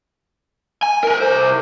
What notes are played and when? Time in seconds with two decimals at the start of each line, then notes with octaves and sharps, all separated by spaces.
0.83 G#5
1.03 A#4 B4
1.20 C2 C5